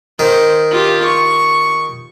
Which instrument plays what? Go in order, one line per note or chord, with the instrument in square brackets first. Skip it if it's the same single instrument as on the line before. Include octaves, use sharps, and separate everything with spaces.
[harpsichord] D#3 [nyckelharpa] C5
[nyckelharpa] F4 G4
C#6